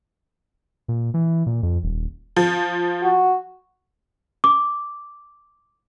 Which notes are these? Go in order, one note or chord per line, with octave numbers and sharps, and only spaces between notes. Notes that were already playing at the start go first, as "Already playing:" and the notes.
A#2
E3
A#2
F2
D#1
F3
F#4
D6